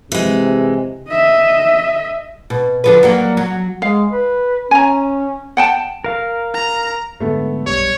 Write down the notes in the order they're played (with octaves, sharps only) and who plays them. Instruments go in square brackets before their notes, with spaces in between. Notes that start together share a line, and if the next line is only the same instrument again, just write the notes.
[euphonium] C3 [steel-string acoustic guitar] E3 G#3
[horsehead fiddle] D#5 E5
[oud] B2
D3 F3 B4
F#3 G3 A#3
F#3
[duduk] G#3 [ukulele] F5
[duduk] B4
[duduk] C#4 [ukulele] G#5 A#5
[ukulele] F#5 G5 A5
[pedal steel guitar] A#4 F5
[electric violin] A#5
[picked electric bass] G#2 D3 [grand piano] A3 B3 A4
[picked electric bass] B1 G2 G3 [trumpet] C#5